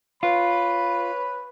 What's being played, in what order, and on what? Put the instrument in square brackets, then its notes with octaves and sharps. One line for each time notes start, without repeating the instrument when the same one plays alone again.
[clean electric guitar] F4 [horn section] B4 C#5 B5